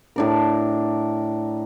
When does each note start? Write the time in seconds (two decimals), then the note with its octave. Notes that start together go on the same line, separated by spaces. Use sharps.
0.16 A2 D4 A#4